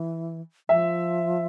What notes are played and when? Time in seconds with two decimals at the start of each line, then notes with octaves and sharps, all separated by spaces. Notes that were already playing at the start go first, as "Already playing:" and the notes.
Already playing: E3
0.69 F3 E5